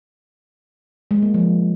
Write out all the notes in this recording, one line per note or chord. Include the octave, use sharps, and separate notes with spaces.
G#3
A#3
F3